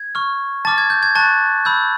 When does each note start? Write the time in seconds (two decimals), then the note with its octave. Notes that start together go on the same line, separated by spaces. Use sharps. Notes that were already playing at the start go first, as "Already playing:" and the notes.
Already playing: G#6
0.15 C#6 F6
0.65 A5 D6 F6 A6
0.78 G#6
0.90 G6
1.03 G#6
1.15 A5 C#6 F#6 A6
1.65 B5 E6 G6